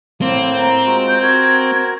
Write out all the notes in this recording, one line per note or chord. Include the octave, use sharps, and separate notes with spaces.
A2 A#3 C4
A#5
G#3 F4 F#4
G6
F#4 A#4 G#6